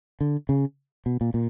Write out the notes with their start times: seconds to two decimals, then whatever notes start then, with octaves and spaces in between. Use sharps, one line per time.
0.21 D3
0.49 C#3
1.06 B2
1.21 A#2
1.34 A#2